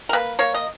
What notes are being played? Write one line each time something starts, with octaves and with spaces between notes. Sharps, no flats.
A#4
A#3 B4
A#3 C#5
D#5